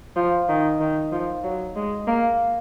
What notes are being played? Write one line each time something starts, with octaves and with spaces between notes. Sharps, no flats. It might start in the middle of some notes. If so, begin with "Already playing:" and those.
F3
D#3
D#3
F3
F#3
G#3
A#3